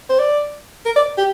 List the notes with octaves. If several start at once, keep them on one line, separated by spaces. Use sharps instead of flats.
C5
D5
A#4
D5
G4